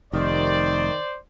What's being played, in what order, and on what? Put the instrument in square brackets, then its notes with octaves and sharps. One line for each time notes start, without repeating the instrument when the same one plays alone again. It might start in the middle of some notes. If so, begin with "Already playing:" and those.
[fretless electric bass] F1 [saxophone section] C3 D#3 [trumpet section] C5 D5